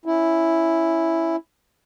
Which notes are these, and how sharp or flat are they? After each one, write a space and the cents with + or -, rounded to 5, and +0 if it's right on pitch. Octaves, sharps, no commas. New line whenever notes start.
C#4 +0 E4 +0